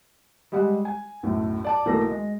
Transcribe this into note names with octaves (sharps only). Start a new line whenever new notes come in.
G3 G#3 G4 F#5
G#5
B1 F#2 A2
D5 A5 D6
B1 E3 A3 A#3 A4 A#6
G#3